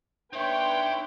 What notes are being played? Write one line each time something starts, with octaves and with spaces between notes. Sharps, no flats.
D4 D#4 B4 C#5 E5 G5 C6